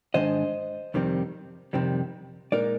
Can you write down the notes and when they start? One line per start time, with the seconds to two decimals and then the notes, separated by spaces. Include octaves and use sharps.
0.14 G#2 D#3 G#3 D4 C5 D#5
0.94 F2 C3 D#3 G3 C4
1.73 F2 C3 D#3 G3 C4
2.52 A#2 G#3 D#4 A#4 D5